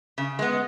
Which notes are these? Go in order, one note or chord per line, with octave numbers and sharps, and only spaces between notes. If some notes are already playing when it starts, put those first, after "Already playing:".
C#3
G#3 B3